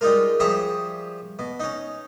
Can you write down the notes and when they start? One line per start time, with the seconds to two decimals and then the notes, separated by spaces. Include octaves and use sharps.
0.01 G3 G#3 D#4 F4 A#4
0.40 F3 G3 G#4 E5 A#5 C#6
1.39 B2
1.60 C#4 D#4